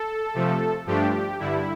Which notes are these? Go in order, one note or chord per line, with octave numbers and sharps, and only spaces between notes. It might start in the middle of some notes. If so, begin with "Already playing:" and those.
Already playing: A4
C3 F3 A3
G2 F3 A3 D4 G4
G2 D3 G3 E4